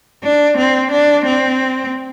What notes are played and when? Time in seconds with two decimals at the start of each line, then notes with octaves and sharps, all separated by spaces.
0.23 D4
0.57 C4
0.92 D4
1.26 C4